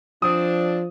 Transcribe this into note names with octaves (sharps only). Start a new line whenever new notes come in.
F3 C4 D4 D#6